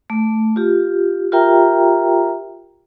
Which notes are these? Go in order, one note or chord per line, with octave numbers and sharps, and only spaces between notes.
A3
F4 G4
F4 G4 A#4 E5 G5 A#5